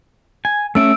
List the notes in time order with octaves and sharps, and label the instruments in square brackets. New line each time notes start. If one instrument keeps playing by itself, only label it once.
[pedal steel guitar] G#5
[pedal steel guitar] A3 C#4 E5 [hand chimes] E6 D7